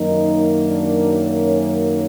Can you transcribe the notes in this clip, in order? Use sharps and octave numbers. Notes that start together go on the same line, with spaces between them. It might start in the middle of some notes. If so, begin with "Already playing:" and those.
Already playing: F#2 D#3 F#3 A#3 D#4
D4
C#4